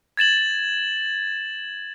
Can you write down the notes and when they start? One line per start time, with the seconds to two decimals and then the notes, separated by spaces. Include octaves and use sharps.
0.17 G#6 A6 E7 F#7